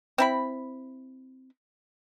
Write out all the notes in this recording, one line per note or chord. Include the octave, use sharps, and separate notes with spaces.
C4 E4 B5